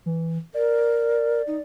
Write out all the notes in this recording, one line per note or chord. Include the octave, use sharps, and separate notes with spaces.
E3
A#4 D5
D#4